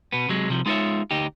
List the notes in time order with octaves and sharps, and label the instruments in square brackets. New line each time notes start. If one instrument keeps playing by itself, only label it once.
[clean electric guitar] B2 B3
C3 F#3 G#3
C2 C3 F3
G#3 D#4 F4 A#4 C#5 E5
D2 D#4 G4